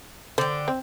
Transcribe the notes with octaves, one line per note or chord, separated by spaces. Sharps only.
D3 C5 G5
C4